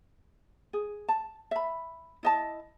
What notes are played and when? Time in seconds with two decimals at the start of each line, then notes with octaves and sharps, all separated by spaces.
0.73 G#4
1.09 A5
1.51 E5 B5
2.23 E4 D#5 A5